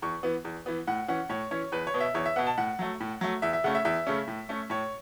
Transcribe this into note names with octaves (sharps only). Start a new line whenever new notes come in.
E2 C#6
E3 B3
E2
E3 B3
A2 F#5
E3 C#4 F#5
A2 C#5
E3 C#4 C#5
E2 B4
C#5
B2 B3
E5
E2 C#5
E5
B2 B3 F#5
A5
A2 F#5
F#3 A3
A2
F#3 A3
E2 E5
E5
C#3 A3 C#4 F#5
E5
E2 E5
C#3 A3 C#4
A2
A3 C#4
A2 C#5